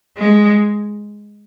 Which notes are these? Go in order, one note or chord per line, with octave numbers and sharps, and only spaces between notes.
G#3